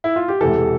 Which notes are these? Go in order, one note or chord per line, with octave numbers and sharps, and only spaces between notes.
E4
F4
G4
E1 E2 C3 E3 A4